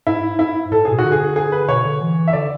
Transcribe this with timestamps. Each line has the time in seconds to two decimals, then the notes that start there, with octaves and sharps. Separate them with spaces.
0.07 G#2 E4
0.39 E4
0.71 A2 A4
0.85 B2 G#4
0.99 F#4
1.04 D3
1.12 G#4
1.36 G#4
1.52 B4
1.69 B2 C#5
1.85 D3
2.01 E3
2.28 E5
2.33 D3 D5